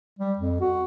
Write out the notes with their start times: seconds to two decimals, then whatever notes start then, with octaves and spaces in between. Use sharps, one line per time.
0.19 G3
0.38 F2
0.61 F#4